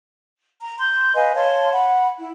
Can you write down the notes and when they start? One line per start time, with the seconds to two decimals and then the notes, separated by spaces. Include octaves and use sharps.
0.61 A#5
0.78 C6 G6
1.14 B4 D#5 F5 G#5
1.35 C#5 F5 A5 C6
1.73 F#5 B5
2.19 E4